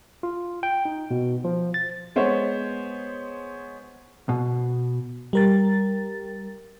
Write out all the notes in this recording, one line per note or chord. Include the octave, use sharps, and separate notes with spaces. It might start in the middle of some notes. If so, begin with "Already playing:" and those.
F4
G5
D#4
B2
F3
A6
G#3 B3 C5 C#5
B2
G3 A#4 A6